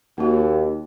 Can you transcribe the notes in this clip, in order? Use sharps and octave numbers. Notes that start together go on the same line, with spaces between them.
D#2 A#3 C#4 F#4